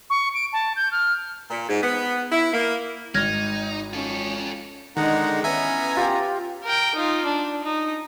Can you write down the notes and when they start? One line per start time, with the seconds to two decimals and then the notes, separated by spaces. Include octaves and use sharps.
0.10 C#6
0.34 D7
0.53 A5
0.76 G6
0.92 F6
1.50 A#2
1.69 G#2
1.83 B3
2.32 E4
2.53 A#3
3.15 G#1 D#4 F6 G#6 A#6
3.94 C#4 F4 A4
4.97 D3 D#3 G#3 D#4 F#5 A#5
5.44 E3 B3 C#4 E5 G#5 A#5
5.97 F4 G4 G5
6.64 A#4 G5
6.95 D#4 F4
7.25 D4
7.64 D#4